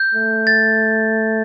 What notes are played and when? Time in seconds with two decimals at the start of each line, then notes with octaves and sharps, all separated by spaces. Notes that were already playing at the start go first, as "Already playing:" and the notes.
Already playing: G6
0.14 A3
0.47 A6